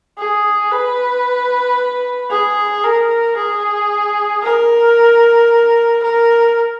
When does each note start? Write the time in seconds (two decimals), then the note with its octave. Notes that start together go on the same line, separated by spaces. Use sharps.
0.18 G#4
0.72 B4
2.30 G#4
2.84 A#4
3.37 G#4
4.43 A#4
6.03 A#4